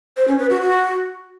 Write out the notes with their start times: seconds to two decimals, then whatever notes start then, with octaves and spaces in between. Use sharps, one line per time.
0.17 C5
0.28 C#4
0.39 B4
0.50 F#4
0.61 F#4